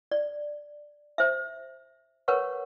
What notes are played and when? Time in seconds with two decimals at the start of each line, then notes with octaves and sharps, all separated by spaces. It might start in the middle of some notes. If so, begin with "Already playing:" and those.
0.12 D5
1.18 C5 E5
2.28 A#4 B4 C#5 F#5 C#6